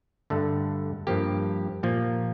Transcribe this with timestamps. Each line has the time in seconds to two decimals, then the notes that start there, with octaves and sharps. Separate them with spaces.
0.30 G2 D3 A3
1.07 G2 F3 A#3 G4
1.83 A#2 F3 A#3